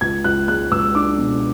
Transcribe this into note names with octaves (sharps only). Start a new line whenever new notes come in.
C#2 G#6
C#2 F#6
G#3 F#6
C#2 E6
D4 D6
B2